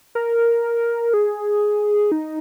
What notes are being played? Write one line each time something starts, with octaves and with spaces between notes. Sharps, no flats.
A#4
G#4
D#4